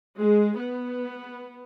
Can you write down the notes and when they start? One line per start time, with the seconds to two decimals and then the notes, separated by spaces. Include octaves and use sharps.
0.19 G#3
0.60 B3